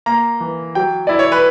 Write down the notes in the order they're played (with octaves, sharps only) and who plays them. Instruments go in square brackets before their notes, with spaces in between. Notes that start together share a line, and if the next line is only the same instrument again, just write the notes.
[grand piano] A#3 A#5
E3
F#3 G5
E4 D5
C#5
B4